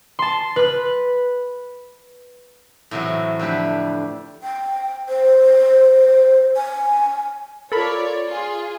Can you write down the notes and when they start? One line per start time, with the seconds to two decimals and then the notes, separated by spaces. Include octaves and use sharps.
0.19 A5 C6
0.56 B4 F#6
2.91 A2 C3 E3 F#3
3.39 F2 D3 A3 G4 B4
4.44 G5
5.09 C5
6.56 G#5
7.72 F4 A4 A#4 C#5 D5 B5
8.28 F4 G#4